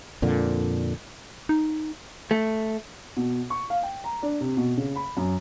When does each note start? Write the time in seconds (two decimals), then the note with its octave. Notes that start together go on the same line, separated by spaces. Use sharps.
0.22 F2 A#2 D3
1.49 D#4
2.31 A3
3.17 B2
3.50 C#6
3.70 F5
3.83 G5
4.04 A#5
4.23 D4
4.41 C3
4.57 B2
4.77 C#3
4.96 B5
5.17 F#2